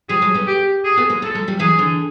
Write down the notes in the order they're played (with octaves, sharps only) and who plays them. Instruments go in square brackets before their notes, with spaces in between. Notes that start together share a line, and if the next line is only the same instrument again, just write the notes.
[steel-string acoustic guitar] F3 G3 [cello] G#4
[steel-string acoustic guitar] F#3 G#3
A3 B3
[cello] G4
G#4
[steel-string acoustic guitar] A3 B3
G#3 A#3
[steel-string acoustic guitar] F#3 G#3 [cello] A4
[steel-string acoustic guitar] F#3 G#3
F3 G3
[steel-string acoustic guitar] E3 F#3 [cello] G#4
[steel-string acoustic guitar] D3 E3